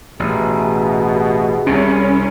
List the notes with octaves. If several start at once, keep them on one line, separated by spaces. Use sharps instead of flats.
A1 B2 E4 G4 G#4
C2 C3 C#4